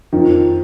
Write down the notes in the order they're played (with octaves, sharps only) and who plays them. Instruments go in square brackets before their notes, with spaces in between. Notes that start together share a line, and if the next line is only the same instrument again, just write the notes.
[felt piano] F2 [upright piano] D#3